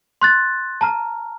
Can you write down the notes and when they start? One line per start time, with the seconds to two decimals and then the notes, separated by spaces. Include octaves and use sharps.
0.21 C6 F#6 A6
0.81 A5 A#5 F6